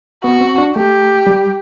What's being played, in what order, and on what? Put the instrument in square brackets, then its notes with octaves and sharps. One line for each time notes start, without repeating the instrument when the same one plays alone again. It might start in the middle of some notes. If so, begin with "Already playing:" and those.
[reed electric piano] B3 [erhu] F#4
[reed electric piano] C4
D4
[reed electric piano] A3 [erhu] G4
[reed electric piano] G3